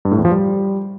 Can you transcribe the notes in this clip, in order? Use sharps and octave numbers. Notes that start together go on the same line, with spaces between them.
G2
A2
E2
F3
G3